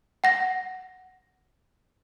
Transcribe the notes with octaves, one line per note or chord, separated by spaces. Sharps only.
F#5 A#6